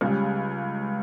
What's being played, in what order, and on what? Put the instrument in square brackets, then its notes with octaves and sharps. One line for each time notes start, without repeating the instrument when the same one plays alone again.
[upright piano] C#2 C#3 G3